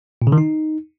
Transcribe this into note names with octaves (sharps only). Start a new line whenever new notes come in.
A#2
C#3
D#3
D#4